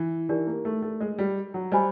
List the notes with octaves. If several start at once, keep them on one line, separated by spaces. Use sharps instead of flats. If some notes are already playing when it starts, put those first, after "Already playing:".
Already playing: E3
E3 D#4 G4 A#4 D5
A#3
A3
A3
G#3
G3
F#3
G3 C5 D#5 G#5 B5